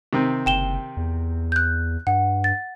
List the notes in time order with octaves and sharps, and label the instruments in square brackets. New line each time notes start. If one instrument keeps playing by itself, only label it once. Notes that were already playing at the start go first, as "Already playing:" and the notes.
[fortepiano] C3 D#3 C4
[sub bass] F#1 [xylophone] G5 E7 G7
[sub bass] E2
[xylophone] F#6 G6
[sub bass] G2 [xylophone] F#5
[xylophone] A6